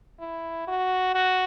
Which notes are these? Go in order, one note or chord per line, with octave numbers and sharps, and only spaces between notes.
E4
F#4
F#4